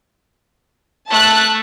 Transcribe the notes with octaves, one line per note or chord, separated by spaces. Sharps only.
A3 A5 F#6